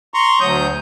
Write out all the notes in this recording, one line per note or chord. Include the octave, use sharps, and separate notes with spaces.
A#5 C6 C#6
D2 F#3 D#6 G6